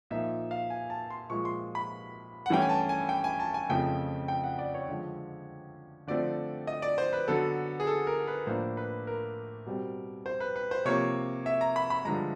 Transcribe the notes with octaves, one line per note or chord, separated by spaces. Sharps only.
A#2 F3 A#3 D#4 E5
F5
G#5
A5
C6
A#2 F3 G#3 C#6
C6
B5
F#5
G2 E3 A3 C#4 G5
G#5
A5
G#5
G5
G#5
A5
G#5
F2 C#3 F3 A3 G5
G5
F#5
D5
C#5
D3 F3 G#3
D3 F3 A3 C4 D5
D#5
D5
C5
B4
D3 F#3 B3 A4
G#4
A4
A#4
B4
A2 F3 A#3 D4 C5
B4
A#4
B2 G3 C4
C5
B4
B4
C5
C3 F3 A#3 C#5
E5
A#5
B5
B5
G2 D3 F3 G#3 A#5